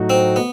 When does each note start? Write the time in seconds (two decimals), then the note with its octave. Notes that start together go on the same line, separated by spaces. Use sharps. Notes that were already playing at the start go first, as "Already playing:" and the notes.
Already playing: A2 F#3 A3 D#4 F#4
0.10 C4
0.36 B3